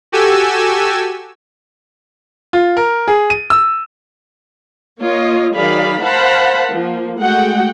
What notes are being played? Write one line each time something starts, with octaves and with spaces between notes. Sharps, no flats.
F#4 G4 A4 G#5 E6
F4
A#4
G#4
D#7
E6
A#3 F4 C#5 D#5
D#3 F#3 G#4 D5 F5 B5
A#4 C5 F5 F#5 A5 B5
F3 A#3
G#3 A3 F#4 F#5 G5